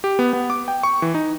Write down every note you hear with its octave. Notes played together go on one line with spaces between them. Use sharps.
G4
B3
B3
D6
G5
C#6
E3
D#4